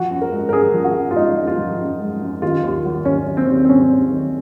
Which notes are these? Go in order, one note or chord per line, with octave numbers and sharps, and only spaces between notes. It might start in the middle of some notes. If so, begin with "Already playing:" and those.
Already playing: F3 F#4
F#2
A#4
G#3
A#4
F#2 G#4
F3
F#4
F#2
F4
G#3 D#4
F#2
F4
F3
F#2
G#3
F#2
D#3 F4
D#2
F#3
D#2 C#4
D#3
C4
D#2
C4
F#3 C#4
D#2
D#3